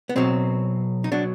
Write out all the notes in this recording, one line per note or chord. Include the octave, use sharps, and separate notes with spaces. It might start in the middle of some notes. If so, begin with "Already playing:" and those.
B3
B1 B2 F#3 C4
D#4
B2 F#3 D4